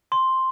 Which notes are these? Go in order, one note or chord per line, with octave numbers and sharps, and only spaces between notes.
C6